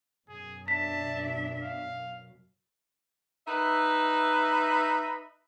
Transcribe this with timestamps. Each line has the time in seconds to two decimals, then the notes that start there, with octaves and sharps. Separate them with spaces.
0.29 F#2 B2 G#4
0.68 D4 E5 A5 B6
1.62 F5
3.47 D#4 B4 E5